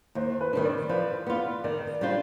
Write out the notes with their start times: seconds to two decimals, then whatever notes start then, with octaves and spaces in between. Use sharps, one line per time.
0.15 D#2 C5
0.41 B4
0.53 D#3 G3 D4
0.65 D5
0.89 F3 B4
1.26 B3 F4
1.64 D#3 D5
2.01 G3 D4 F4 C5